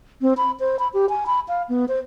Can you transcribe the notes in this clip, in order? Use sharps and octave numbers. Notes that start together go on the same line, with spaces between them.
C4
B5
C5
B5
G4
G#5
B5
F5
B3
C5